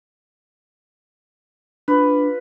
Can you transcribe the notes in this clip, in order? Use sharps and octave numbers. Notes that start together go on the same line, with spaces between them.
D4 F4 B4